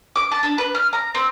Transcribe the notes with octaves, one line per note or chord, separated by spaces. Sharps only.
D6
A5
D4
B4
F6
A#5
C4